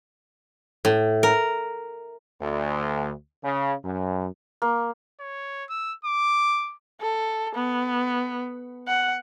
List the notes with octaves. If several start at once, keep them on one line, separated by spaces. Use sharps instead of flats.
A2
A#4
D2
C#3
F#2
A#3
C#5
E6
D6
A4
B3
F#5